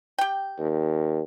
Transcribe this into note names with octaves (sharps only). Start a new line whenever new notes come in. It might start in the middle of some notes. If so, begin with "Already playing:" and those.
G4 G5
D#2